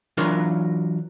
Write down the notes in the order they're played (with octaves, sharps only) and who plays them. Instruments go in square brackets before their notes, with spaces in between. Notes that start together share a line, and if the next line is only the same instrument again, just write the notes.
[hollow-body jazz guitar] E3 F#3 D4 F4 A#4 C6